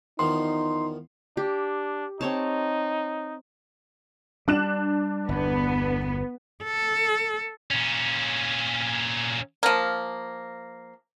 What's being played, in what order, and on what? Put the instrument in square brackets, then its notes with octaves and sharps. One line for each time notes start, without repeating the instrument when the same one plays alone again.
[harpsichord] E2 D#3 F3 [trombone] D#4 [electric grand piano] C6
[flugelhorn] D4 [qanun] G4
[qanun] C4 C#5 A5 [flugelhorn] D#4
[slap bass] G3 [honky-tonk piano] D4 F#6 E7
[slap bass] G1 E2 [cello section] B3
[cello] A4
[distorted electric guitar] A#2 C#4
[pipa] F3 A#3